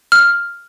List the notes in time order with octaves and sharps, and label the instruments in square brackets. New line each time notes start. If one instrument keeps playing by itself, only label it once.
[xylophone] F6